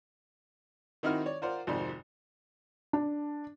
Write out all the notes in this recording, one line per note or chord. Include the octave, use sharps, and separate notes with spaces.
D#3 C4 D#4 E4 F#4 F6
C#5 D5
F4 A#4 C5 D5 F#5
G#1 F2 C3 D#3 C5 D5
D4